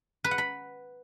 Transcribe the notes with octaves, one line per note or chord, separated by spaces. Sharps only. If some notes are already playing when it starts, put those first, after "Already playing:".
B4
F#5
B5